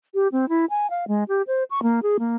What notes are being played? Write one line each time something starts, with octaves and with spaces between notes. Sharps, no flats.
G4
C4
E4
G#5
F5
G#3
G4
C5
C#6
A#3
G#4
A#3